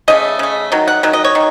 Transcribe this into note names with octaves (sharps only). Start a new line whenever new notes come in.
C#3 A3 D#5
C#3 A3
D#3 F#3
F#5
D#3 F#3
D#5
C#5
D#3